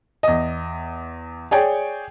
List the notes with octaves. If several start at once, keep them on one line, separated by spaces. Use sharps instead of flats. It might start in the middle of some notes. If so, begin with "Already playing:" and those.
E2 D#5
G#4 C#5 D5 G5